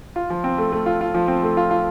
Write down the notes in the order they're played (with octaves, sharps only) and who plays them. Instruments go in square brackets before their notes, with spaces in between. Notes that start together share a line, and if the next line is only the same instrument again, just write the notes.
[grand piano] F4
F3
C4
A3
A3
F4
F4
F3
C4
A3
F4
F4